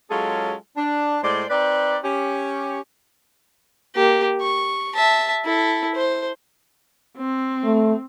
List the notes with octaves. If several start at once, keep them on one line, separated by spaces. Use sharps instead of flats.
F#3 G#3 C#4 F4 G#4 A4
D4
A2 G#3 C5 D5
C4 D#4 B4 D5
C#4 G4
A#3 G4
C#6
E5 A5
E4 A4
C5
C4
A3